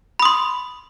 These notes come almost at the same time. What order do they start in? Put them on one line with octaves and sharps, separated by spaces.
B5 D#6 C6